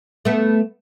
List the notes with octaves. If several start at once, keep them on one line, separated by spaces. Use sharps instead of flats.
A3 B3